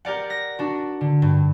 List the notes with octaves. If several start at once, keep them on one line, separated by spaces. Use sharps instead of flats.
G4 A#4 D5 F#5
A#6
D4 F#4
D3
G2